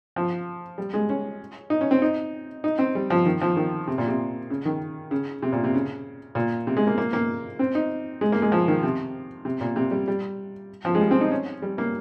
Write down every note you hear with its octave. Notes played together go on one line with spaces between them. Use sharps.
F3
G3
G#3
C#4
D#4
C#4
C4
D#4
D#4
C4
G3
F3
D#3
F3
D#3
C3
A#2
C3
C#3
D#3
C#3
C3
A#2
C3
C#3
A#2
C3
G#3
A#3
A#3
A#3
C4
D#4
G#3
A#3
G#3
F3
D#3
C3
C3
A#2
C3
G3
G3
F3
G#3
G3
C4
D#4
C#4
G3
A#3